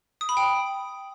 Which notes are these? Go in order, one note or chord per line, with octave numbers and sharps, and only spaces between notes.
D#6
B5
G5